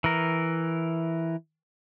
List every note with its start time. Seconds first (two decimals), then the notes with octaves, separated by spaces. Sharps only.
0.04 E3 A#4